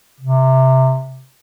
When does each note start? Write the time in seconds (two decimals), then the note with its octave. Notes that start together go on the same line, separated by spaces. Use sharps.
0.20 C3